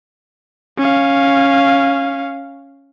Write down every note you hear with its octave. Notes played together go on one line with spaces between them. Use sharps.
C#4 F5